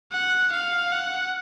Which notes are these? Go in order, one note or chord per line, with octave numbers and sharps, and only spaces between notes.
F#5
F5
F#5